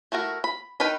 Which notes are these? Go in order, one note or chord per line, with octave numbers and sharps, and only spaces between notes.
A3 E4 F#4 A#4
B5
D#3 D#4 A#4 B4 B5